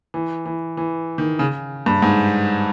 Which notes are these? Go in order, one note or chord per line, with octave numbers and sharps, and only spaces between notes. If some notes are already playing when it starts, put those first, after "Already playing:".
E3
E3
E3
D#3
C#3
G2
G#2